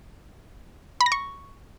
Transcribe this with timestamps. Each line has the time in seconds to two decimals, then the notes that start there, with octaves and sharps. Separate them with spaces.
1.01 B5
1.06 A#6
1.12 C#6